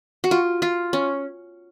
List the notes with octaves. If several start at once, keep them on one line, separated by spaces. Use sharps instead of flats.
F#4
F4
F4
C#4